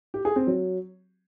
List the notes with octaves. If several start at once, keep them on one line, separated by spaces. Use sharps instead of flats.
G4
G#4
C4
F#3